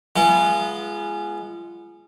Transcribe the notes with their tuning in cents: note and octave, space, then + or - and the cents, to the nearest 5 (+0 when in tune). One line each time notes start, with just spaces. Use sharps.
G#3 +0 B3 -20 F4 -35